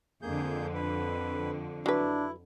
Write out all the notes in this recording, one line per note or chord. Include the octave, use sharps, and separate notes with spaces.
F2 D3 A#3 G#4 G6
B4
F#3 D4 E4 B4